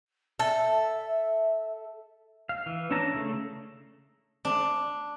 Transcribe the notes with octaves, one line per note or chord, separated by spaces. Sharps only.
A4 E5
F5
E3
C#4 D4 E4 A5 A#5
C#3 A3
D4